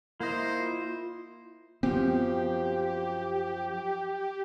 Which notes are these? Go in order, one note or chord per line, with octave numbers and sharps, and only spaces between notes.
A#3 E4 C5 D#5
F4
F#2 F3 B3 C4 G4